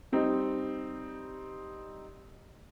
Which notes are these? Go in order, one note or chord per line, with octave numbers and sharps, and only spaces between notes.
G3 C4 D#4